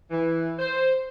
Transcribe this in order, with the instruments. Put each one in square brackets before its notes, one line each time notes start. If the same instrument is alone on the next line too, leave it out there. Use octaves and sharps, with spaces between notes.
[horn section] E3
C5